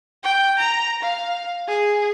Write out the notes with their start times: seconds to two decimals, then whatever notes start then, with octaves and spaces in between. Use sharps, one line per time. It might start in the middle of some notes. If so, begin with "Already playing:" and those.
0.24 G5
0.59 A#5
1.03 F5
1.68 G#4